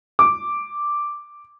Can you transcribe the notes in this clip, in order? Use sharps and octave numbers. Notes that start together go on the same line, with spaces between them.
D6